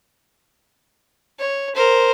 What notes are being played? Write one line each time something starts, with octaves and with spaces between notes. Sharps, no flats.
C#5
A#4 C5